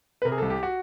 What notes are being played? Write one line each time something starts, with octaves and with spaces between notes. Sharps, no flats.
B4
C3 A#4
G#4
C2 A4
G4
F#4